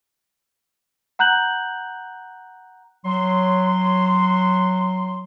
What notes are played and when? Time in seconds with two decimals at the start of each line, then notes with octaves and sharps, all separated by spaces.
1.19 F#5 A#5 F#6 G6 F#7
3.05 F#3 C6